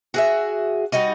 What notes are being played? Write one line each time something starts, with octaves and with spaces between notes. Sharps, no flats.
F#4 G#4 E5
G3 D#4 F#4 D#5